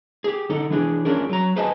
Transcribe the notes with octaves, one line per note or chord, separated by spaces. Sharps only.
G4 G#4
D3 D#4 A4
E3 D4 G#4
C#4 D4 F4 G#4 A#4
F#3 A#5
G#4 B4 C5 D#5 G#5 A5